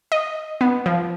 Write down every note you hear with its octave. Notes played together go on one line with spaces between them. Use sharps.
D#5
B3
F3